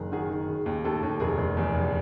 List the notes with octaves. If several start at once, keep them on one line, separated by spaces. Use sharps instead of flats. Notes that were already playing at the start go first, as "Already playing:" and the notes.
Already playing: F#1 D#3 G#4 A#4
D#3 F#4 G#4
D#3
C#3
D#2
D#2 G4 A4
D#2
F1 G#4 A#4
F1
E2
F1